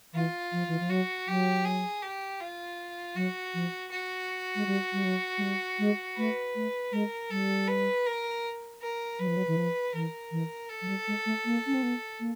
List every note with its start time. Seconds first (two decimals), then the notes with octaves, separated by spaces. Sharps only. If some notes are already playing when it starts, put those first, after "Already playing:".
0.14 E3 F4
0.52 F3
0.68 E3
0.80 F3
0.89 F#3 F#4
1.28 F#3 G4
1.64 G#4
2.02 G4
2.40 F4
3.16 F#3 F#4
3.54 F3
3.91 F#4
4.56 G#3
4.66 G3
4.93 G3
5.04 F#3
5.38 G#3
5.42 G3
5.79 G#3
6.17 A3 B4
6.55 A3
6.92 G#3 A#4
7.30 G3 A4
7.68 B4
8.06 A#4
8.82 A#4
9.19 F#3 B4
9.28 F3
9.37 F#3
9.47 E3
9.57 F3
9.94 E3 A#4
10.32 E3
10.69 A4
10.82 F#3
10.88 G3
11.08 G#3
11.26 A3
11.45 A#3
11.66 C#4
11.74 C4
11.83 B3
12.20 A#3